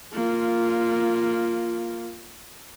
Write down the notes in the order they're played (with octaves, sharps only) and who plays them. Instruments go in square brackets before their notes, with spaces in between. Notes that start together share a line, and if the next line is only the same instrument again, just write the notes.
[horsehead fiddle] A#3 F4